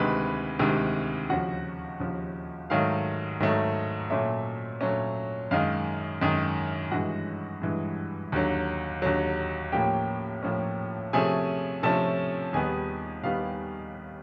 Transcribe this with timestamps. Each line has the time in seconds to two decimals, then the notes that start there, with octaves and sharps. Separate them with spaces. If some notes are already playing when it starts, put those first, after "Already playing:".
Already playing: D2 C3 D#3 G#3 B4 B5
0.59 D2 C3 D#3 G#3
1.30 D#2 C#3 F3 F#4 F#5
2.00 D#2 C#3 F3
2.70 G#2 D#3 F#3 A3 F5
3.40 G#2 D#3 F#3 A3
4.10 A#2 F#3 A3 C#4 E5
4.81 A#2 F#3 A3 C#4
5.51 F#2 D#3 G#3 F5
6.22 F#2 D#3 G#3
6.91 G2 E3 G#3 F#4 F#5
7.62 G2 E3 G#3
8.32 D#2 D3 F#3
9.02 D#2 D3 F#3
9.72 A2 F3 A#3 C#4 G4 G5
10.43 A2 F3 A#3 C#4
11.13 C3 F3 A3 C#4 G#4 G#5
11.83 C3 F3 A3 C#4 A4 A5
12.53 D#2 D#3 G3 B3 G#4 G#5
13.23 D#2 D#3 G3 B3 F5